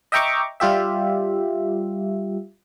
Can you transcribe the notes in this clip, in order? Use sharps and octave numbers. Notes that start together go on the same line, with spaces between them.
D#5 E5 G5 A#5 C#6 D6
G3 F4 G4 E5